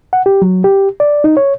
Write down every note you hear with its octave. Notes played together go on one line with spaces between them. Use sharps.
F#5
G4
F#3
G4
D5
D#4
C#5